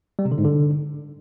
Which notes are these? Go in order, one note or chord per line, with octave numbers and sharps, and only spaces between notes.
G3
C3
D3
G#2
D3